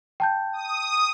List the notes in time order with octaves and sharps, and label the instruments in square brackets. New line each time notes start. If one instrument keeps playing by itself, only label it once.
[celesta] G5 A5 G6
[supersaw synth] D#6